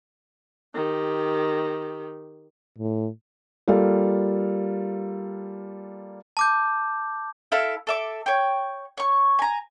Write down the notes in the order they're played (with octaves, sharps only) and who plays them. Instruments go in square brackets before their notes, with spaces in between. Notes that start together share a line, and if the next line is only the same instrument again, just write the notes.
[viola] D#3 G4
[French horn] A2
[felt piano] G3 A#3 F4 A4 F5
[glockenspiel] A5 D6 G6
[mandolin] E4 A4 E5 F5
A4 E5 D6
C#5 G5
C#5 C#6
G#5 A#5